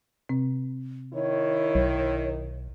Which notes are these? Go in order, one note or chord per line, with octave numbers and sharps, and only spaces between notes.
C3 C4
D#3 E4 C#5
B1